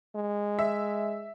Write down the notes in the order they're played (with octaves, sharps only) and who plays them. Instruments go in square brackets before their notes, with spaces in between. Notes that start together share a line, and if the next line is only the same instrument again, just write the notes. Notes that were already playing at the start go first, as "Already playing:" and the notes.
[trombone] G#3
[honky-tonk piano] E5